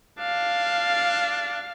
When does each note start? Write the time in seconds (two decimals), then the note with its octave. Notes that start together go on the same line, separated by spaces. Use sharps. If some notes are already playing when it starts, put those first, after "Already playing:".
0.19 D4 F5